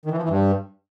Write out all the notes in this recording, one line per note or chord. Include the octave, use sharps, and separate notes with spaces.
D#3
E3
F3
E3
G2